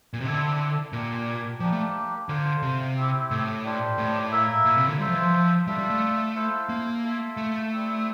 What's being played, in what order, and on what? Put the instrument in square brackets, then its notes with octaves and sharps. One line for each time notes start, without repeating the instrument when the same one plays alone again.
[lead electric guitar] A#2
C3
[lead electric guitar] D3 [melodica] C4 E4 A4 D5
[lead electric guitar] A#2 [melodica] D4 G4 A#4
[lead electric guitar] F3 [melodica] G3 A#3 D4 G4
[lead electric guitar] A3
[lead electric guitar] D3 [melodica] F4 C5 F5
[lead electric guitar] C3
[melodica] C4 E4 G4
[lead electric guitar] A2
[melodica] G3 D4 G4 C5
[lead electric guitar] A2
[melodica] A#3 E4 A#4 E5
[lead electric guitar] A#2
C3
D3
[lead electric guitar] G3 [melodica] F4 C5 E5
[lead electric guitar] F3
E3
F3
[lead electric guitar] G3 [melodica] D4 F4 A4 E5
[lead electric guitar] G3
A3
[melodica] E4 A4 C5 F5
[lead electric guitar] A#3
[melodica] F4 A4 E5
[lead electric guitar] A3
[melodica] G3 C4 E4